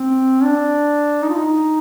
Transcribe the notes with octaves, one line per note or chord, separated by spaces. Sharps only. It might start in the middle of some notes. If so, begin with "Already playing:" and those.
Already playing: C4
D4
D#4
F4
D#4